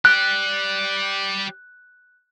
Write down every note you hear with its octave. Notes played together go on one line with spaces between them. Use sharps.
G4 D5 F#6